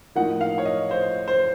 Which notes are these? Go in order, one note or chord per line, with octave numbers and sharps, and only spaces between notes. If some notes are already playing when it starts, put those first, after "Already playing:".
A2 F3 A#3 D#4 F#5
F5
C#5
D#5
C5
C5